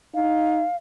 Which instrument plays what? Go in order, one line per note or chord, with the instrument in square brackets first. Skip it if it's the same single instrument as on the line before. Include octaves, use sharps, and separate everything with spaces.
[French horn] D#4 [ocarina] F5